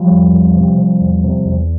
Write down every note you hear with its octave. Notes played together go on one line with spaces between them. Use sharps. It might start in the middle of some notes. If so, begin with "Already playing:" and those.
Already playing: F3 G3
E2
E2
C3
C3
E2
C3
E2